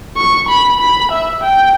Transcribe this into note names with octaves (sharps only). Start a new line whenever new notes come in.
C#6
B5
B5
E5
G5